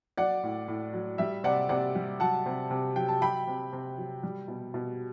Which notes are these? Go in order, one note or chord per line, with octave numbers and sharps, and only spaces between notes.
F#3 D5 F#5
A2
A2
F#3
G3 E5
C3 D5 F#5
C3 D5 F#5
G3
F#3 F#5 A5
C3
C3
F#3 G5
A5
F#3 G5 B5
C3
C3
F#3
G3
B2
B2